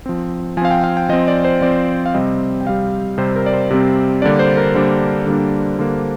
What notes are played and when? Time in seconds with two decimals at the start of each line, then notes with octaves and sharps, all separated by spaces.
0.06 F3 C4
0.57 F3 G#5
0.62 C4 F5
0.71 G5
0.84 F5
0.97 G5
1.09 F3 C4 D#5
1.28 D5
1.45 C5
1.61 F3 C4 D5
2.06 F5
2.14 C3 G3 C4 D#5
2.61 G5
2.66 C3 G3 C4 F5
3.18 C3 G3 C4 C5
3.36 A#4
3.46 D5
3.54 C5
3.71 C3 G3 C4
4.22 D3 G3 A#3 D4 D5
4.39 C5
4.57 A#4
4.74 D3 G3 A#3 D4 C5
5.26 D3 G3 A#3 D4
5.79 D3 G3 A#3 D4